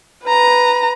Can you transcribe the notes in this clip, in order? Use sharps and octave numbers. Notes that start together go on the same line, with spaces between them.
B4 A#5